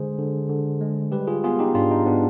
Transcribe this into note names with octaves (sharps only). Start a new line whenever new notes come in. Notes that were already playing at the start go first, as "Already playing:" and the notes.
Already playing: D3 G#3 G#4 C5
D3
D3
G#3
G3 G4 B4
F4 G#4
B3 F4 G#4
D#4 G4
G#2 D4 F4
D#4
B3 D4